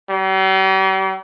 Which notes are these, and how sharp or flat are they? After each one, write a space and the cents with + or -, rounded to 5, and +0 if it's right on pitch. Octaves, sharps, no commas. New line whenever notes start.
G3 -45